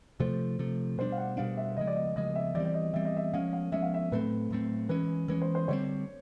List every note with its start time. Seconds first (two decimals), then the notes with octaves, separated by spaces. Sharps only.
0.20 C3 F3 A3 C5
0.59 C3 F3 A3
0.98 B2 G3 B3 D4 C5
1.12 F5
1.18 F#5
1.37 B2 G3 B3 D4 F5
1.57 E5
1.77 C#3 F3 G#3 D#5
1.87 D5
1.96 D#5
2.16 C#3 F3 G#3 D#5
2.35 E5
2.55 E3 G3 C4 D5
2.65 D5
2.74 D#5
2.93 E3 G3 C4 E5
3.05 D#5
3.17 E5
3.33 F3 G#3 C#4 F5
3.53 F5
3.72 F3 G#3 C#4 E5
3.82 F5
3.94 E5
4.12 A2 F#3 A3 C4 B4
4.51 A2 F#3 A3 C4
4.89 E3 G#3 C#4 B4
5.28 E3 G#3 C#4 B4
5.42 C5
5.55 C5
5.68 D3 G3 C4 C#5